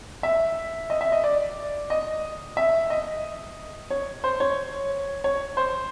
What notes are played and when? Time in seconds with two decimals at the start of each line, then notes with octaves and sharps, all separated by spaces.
0.23 E5
0.90 D#5
1.01 E5
1.12 D#5
1.24 D5
1.90 D#5
2.57 E5
2.90 D#5
3.90 C#5
4.24 C5
4.40 C#5
5.24 C#5
5.57 C5